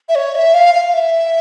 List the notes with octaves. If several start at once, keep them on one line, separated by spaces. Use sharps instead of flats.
E5
C#5
E5
F5
F5
E5